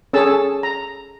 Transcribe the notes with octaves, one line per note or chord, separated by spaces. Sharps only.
C#4 G#4 A4 A5 E6
A#5